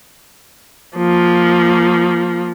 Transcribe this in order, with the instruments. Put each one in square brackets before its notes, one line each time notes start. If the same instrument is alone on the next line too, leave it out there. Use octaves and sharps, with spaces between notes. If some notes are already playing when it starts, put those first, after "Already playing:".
[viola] F3 A#3